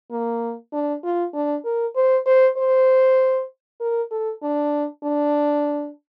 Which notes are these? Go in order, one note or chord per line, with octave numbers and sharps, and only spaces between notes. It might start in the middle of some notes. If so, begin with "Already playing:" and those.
A#3
D4
F4
D4
A#4
C5
C5
C5
A#4
A4
D4
D4